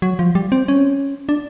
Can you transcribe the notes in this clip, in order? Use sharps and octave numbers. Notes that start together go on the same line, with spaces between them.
F#3
F3
G3
C4
C#4
D4